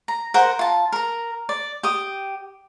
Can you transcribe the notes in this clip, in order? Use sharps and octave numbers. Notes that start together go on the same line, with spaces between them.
A#5
A#4 C5 F#5
F4 A5
A#4 A#5
D5
G4 D#6